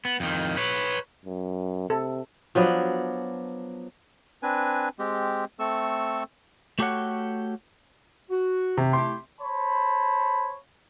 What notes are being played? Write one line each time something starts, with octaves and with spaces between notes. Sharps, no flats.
B3
F2 D#3
B4 C#5
F#2
C3 A4
F3 F#3 B3 D4
C4 D4 B4 G#5
G#3 C4 G4
A3 C4 A4 C#6 E6
A3 F#4 G4 A4 C#5 F#5
F#4
C3
A3 E4 G4 C6
C5 C#5 A5 B5